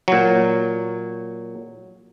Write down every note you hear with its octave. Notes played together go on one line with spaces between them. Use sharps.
A#2 F#3